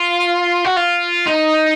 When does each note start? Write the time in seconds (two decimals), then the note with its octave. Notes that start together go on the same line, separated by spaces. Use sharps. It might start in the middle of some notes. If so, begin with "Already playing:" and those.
Already playing: F4
0.65 F#4
0.77 F4
1.27 D#4